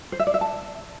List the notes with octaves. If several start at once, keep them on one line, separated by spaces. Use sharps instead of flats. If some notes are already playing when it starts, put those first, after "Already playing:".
C5
E5
D5
E5
A5